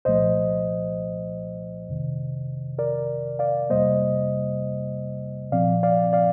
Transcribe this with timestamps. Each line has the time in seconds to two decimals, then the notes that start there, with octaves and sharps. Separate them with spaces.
0.05 C2 A#2 F3 A3 C5 D#5
1.88 F2 C3 D#3
2.79 A#4 D5
3.39 D5 F5
3.70 F2 C3 G3 A#3 C5 D#5
5.52 A#2 F3 C4 D5 F5
5.83 D5 F5
6.13 D5 F5